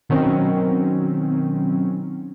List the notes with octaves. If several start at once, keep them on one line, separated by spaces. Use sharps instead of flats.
B2 D#3 F#3 C4 C#4